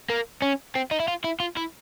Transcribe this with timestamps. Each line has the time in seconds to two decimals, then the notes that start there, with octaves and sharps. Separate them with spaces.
0.10 A#3
0.42 C#4
0.75 C4
0.91 D#4
1.00 E4
1.08 F4
1.24 E4
1.40 F4
1.57 E4